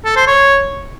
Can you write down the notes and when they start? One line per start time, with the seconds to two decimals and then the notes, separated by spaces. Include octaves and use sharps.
0.05 A4
0.16 C5
0.27 C#5